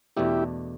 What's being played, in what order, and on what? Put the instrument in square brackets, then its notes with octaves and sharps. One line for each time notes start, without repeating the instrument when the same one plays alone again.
[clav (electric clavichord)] E2 B2 A3 D4 [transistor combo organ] E4 G4